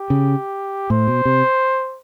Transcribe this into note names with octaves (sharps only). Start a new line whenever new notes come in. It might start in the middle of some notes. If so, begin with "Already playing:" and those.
Already playing: G4
C#3
A2 C5
B2
C3